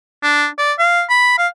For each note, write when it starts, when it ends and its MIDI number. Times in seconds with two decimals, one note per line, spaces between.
0.23 0.47 62
0.58 0.73 74
0.79 1.02 77
1.09 1.36 83
1.38 1.48 77